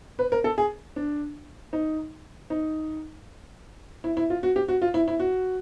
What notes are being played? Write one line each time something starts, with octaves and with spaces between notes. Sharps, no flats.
B4
A#4
A4
G#4
D4
D#4
D#4
E4
E4
F4
F#4
G4
F#4
F4
E4
E4
F#4